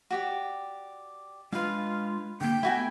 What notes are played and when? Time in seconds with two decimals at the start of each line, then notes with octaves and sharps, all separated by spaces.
0.11 F#4 G4 D5
1.53 G#3 D4 F4 B4 D#5 F5
2.41 D3 A#3 G5
2.63 A3 B3 E4 F#4 G#5